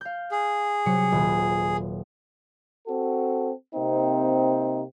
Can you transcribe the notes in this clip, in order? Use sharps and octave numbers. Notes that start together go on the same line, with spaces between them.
F5 G6
G#4
C3 F#3 C#7
D#1 B4
C4 F#4 A4
C3 A#3 C4 D#4